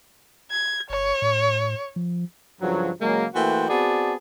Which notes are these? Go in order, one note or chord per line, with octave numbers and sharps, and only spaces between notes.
G#6
G1 C#5
A2
F3
G2 C#3 F3 F#3
C#3 F#3 G#3 A#3
E3 A3 A#3 F#4 C5 G5
B3 C4 F#4 G#4 D5 A5